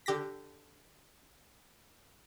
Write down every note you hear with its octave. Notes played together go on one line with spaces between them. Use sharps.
D3 G4 A#6 B6